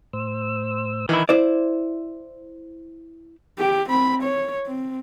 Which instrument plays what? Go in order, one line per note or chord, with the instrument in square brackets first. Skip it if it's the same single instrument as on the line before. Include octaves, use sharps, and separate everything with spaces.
[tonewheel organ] A2 C5 E6
[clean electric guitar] D#3 E4 [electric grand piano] E3
[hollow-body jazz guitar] E4 C5 D5
[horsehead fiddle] G4
C4 B5
C#5
C4